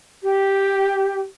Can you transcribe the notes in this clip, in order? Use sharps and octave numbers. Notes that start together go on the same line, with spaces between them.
G4